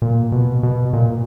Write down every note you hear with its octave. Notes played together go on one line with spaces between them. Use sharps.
A#2
B2
B2
A#2